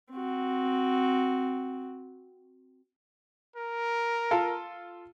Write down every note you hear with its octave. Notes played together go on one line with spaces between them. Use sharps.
C4 F#4
A#4
F4 A4 F5